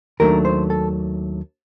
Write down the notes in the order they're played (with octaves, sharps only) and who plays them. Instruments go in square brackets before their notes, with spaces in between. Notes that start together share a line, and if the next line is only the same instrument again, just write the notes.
[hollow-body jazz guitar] D#2 D#3 F#3 A3 D4 A#4
C5
A4